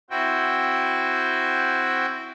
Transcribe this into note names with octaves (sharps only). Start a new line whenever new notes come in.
C4 E4 F#4 G5